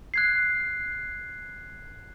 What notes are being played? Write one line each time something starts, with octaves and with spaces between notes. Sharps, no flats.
F#6 G#6 C7